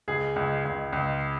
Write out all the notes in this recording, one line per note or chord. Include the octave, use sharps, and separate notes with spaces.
C#2 G#4
C#2
C#2
C#2